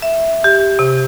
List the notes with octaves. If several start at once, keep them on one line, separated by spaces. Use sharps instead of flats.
E5
G4
C3